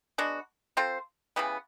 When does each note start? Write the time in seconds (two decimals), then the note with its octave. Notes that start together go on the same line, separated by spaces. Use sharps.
0.18 G#3 B3 D4 F#4
0.77 C4 F4 A4 C5
1.36 C#3 E3 G3 B3